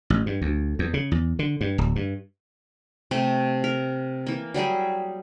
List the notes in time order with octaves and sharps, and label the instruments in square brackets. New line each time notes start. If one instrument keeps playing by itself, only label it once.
[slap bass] A1
G2
D2
E2
C#3
E2
D3
G2
D1
G2
[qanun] C3 A3 G4
A#4
E3 A#3
F#3 G3 G4 G#4